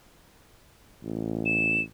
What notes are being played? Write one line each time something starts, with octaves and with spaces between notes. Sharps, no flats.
A1
E7